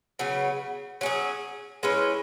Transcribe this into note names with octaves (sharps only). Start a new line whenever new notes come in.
C#3 F#3 B3
F#3 C#4 G#4
G#3 C#4 E4 B4